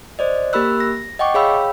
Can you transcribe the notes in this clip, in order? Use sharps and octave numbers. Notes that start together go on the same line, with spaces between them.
C5 D5 D#5
A#3 G4 A#4 B5 E6 F#6
A#6
D#5 F#5 G5 C#6 D6
G#4 C#5 F5 G5 B5 E6